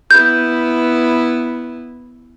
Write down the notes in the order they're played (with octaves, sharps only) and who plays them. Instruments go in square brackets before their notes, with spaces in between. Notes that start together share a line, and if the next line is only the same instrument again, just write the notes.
[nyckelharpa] B3 E4 [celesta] G6